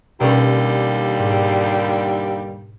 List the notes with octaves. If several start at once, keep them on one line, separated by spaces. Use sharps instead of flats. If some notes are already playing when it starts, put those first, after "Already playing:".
D#2 B2 D3 G3 C#4
G#2